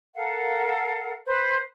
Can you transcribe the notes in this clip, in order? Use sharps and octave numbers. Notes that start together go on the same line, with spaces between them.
A4 A#4 F5 F#5
B4 C5